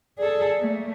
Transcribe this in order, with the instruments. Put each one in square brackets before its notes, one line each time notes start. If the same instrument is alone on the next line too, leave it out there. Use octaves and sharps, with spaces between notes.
[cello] G#4 A4 [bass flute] D5
[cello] A3 A#3